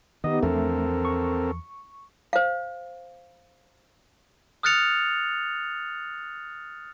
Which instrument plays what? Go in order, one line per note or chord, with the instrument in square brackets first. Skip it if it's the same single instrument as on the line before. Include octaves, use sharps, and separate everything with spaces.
[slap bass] D#3 [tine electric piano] B3 D#4 G4 [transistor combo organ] D#5
[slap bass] E2 F3 D4 [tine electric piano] A3 [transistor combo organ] C4 A4 A#4
[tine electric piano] C#6
[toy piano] C5 F5
[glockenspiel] D#6 F6 F#6 A6 C#7 F7